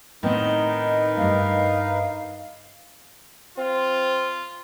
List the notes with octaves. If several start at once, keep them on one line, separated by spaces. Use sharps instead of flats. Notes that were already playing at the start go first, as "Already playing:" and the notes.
A2 D#3 B3 C4 D#4 A#4 B4
G2 A3 F5
C4 F4